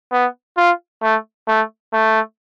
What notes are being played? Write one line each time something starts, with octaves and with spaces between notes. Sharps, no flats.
B3
F4
A3
A3
A3